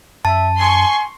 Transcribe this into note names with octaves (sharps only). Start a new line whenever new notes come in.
F#2 E5 A5
G#5 C6 C#6